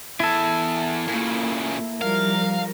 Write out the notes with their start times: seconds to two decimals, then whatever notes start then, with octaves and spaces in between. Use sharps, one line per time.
0.20 E2 E4 A4 G#5
1.08 A#2 C#3 A#3
2.02 F3 G3 A#4 F5